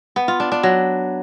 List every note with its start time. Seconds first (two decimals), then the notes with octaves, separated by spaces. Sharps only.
0.16 B3
0.28 F4
0.40 D4
0.52 D4
0.63 F#3